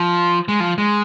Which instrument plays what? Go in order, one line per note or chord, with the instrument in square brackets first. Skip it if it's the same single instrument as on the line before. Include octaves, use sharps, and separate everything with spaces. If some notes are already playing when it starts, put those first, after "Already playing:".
Already playing: [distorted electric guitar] F3
G#3
F3
G#3